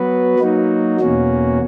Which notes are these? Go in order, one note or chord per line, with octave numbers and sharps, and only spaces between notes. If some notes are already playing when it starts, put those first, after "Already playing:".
Already playing: F#3 B3 F#4 B4
F#3 A#3 D#4 F#4
E2 B2 A#3 C#4 F#4